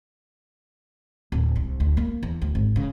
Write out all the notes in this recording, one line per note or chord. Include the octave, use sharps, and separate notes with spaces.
D1
C2
D2
A#3
E2
D2
G#1
C#3